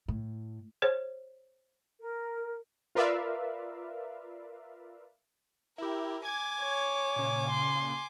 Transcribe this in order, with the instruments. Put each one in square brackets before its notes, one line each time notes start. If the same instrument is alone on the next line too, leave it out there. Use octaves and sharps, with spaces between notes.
[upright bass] A2
[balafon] G#4 C5 C#5
[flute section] A#4
[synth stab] F4 A#4 B4 D5 E5 F5
[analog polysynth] E4 G4 [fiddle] A#4
[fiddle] G#5 D6 [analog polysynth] G#6
[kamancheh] C#5
[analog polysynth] A#2 C#3
[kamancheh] C6